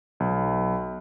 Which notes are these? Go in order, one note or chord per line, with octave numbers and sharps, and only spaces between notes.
B1